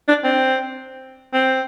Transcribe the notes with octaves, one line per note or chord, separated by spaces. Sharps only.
D4
C4
C4